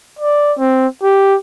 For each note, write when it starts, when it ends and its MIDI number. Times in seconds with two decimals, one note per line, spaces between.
0.19 0.53 74
0.59 0.87 60
1.03 1.36 67